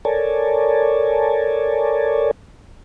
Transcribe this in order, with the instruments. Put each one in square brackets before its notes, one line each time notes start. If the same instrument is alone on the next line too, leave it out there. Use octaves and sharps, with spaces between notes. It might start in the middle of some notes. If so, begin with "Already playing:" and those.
[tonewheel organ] A4 A#4 C#5 D5 G#5 A5